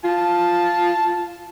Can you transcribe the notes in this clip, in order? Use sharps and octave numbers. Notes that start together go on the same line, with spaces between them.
F4 A5